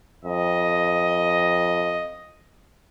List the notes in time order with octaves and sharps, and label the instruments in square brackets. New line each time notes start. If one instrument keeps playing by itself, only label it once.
[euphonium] F2 [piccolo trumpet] D#5